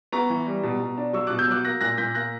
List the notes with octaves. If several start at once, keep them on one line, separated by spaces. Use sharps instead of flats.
B3 A#5 C#6
E3
G3
B2
B2
D4
F#3 C#6 E6
B2 D6 F#6
E6 G6
F#3 D6 F#6
A#3 F#6 A#6
A#2 F#6 A#6
A#2 G6 B6
A#3 F#6 A#6